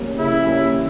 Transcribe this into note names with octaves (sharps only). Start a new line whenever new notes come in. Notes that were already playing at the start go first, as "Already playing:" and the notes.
Already playing: G3 A#3 C#4
C#3 E4
G3 A#3 C#4
E3